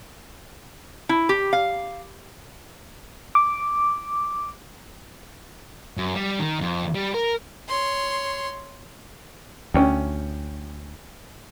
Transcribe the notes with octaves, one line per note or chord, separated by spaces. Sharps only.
E4
G4
F5
D6
F#2
G3
D#3
F2
G3
A#4
C#5 C6
D2 C#4 G5